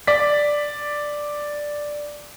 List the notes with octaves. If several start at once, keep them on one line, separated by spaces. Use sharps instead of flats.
D5 B6